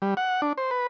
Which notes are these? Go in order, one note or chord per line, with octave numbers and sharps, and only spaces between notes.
G3
F#5
D4
C5
B4